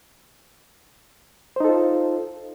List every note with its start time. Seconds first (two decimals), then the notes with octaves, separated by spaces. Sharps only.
1.56 C5
1.60 D#4
1.65 A4
1.69 F4